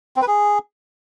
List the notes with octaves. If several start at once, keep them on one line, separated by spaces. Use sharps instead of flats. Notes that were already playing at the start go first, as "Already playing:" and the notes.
C4
B4
G#4